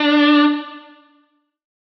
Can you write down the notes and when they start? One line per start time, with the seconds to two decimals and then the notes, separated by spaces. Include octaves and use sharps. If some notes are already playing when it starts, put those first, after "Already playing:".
Already playing: D4